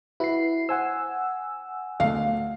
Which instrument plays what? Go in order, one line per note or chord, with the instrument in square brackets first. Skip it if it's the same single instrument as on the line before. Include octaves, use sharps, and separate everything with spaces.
[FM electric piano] E4 C7 [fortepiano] F#4 B4
[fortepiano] C5 [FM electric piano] F#5 G#5 E6
[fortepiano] D2 A3 [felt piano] F5